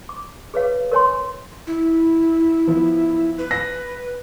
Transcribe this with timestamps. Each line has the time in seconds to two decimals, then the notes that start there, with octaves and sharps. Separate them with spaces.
0.09 D6
0.54 G#4 B4 C#5 F5
0.92 A#4 C#5 G#5 C6
1.67 E4
2.67 F3 B3
3.38 B4
3.51 A#6